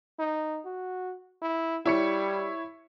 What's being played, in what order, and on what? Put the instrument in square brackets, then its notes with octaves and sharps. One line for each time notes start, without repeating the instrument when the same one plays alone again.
[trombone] D#4
F#4
E4
[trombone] G3 [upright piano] E4 C#5 C#7